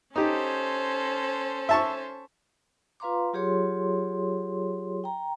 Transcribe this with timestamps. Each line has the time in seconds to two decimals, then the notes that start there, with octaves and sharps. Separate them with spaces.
0.16 C#4 D#4 G4 A4 C5
1.69 E5 A5 C#6
3.00 F4 B4 F5 A#5 C6 D6
3.33 F#3 F4 G4 G#4 C#5 C6
5.04 G5 A#5